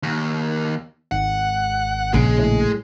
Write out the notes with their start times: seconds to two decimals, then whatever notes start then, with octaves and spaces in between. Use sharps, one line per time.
0.03 D#2
1.12 G#1 F#5
2.14 A#1 C#3 G#3 G#4
2.39 A2